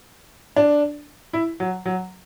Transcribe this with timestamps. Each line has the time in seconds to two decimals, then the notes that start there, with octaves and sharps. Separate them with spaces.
0.56 D4
1.33 E4
1.60 F#3
1.86 F#3